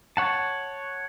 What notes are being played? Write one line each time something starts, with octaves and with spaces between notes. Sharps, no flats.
C#5 F#5 A5